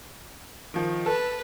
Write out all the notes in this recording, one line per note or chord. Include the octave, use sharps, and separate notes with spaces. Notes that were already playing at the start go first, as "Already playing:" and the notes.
D#3 F3
A4 B4